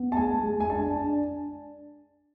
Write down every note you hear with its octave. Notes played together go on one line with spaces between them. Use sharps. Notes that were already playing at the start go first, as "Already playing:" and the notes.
Already playing: B3
A5
G#3 G#5
G#3
G#5
D4 A5
D4